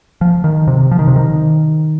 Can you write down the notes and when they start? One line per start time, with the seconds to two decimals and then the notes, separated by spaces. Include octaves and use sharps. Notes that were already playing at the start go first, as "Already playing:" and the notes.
0.21 F3
0.44 D#3
0.68 C3
0.91 F3
0.99 D#3
1.07 C3
1.16 D#3